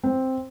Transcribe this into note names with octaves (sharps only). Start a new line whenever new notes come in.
C4